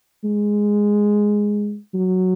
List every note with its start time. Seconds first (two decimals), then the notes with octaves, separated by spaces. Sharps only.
0.24 G#3
1.95 F#3